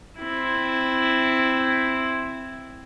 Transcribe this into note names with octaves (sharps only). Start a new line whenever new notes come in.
C4 E4